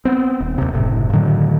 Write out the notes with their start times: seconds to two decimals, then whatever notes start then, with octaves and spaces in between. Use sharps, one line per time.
0.05 B3 C4
0.40 D#1
0.58 D#2 C3
0.73 F#1 A2 C3
1.13 A2 D3 D#3 F#3